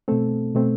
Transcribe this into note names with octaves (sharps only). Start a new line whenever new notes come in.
B2 A3 C4 A4
B2 A3 C4